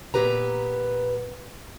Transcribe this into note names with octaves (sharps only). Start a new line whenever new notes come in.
A#2 B3 G4 B4 A#5